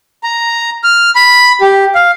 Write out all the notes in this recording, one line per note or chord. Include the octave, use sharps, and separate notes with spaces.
A#5
F6
B5
G4
F5